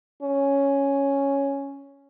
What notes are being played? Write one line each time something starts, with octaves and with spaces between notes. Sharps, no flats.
C#4